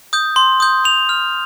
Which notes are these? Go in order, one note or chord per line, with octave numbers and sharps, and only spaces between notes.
D#6 G6
C6
D#6 G6
C6 F7
F6